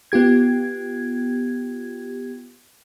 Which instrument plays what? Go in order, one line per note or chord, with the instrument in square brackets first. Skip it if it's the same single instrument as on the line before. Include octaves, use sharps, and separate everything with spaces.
[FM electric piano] B3 F4 G4 G#6